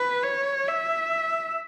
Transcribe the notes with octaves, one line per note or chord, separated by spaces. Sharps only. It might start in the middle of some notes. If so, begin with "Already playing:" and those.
Already playing: B4
C#5
E5